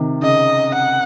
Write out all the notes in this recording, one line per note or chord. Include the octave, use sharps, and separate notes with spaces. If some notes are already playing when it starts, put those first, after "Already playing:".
Already playing: C3 D#3
C#3 D#5
F#5